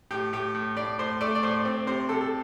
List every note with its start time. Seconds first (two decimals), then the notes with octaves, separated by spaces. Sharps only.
0.11 A2 G4
0.33 A2 G4
0.54 A2
0.77 A2 D5
0.99 A2 C5
1.21 A3 D5
1.35 D5
1.43 A2 C5
1.65 C4
1.87 C3 C5
2.09 C3 A4
2.21 A4